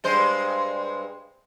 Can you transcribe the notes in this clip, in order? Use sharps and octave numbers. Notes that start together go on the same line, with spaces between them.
G2 G#3 C5